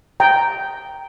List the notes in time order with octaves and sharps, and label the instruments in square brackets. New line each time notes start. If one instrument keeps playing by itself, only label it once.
[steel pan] G5 A#5